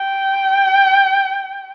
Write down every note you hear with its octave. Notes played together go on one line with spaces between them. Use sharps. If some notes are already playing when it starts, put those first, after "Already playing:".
Already playing: G5